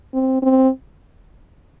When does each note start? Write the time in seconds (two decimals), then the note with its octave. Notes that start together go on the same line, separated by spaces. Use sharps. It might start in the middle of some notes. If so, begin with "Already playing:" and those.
0.14 C4
0.43 C4